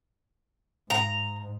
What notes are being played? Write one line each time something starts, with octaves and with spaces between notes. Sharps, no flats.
G#2 A#5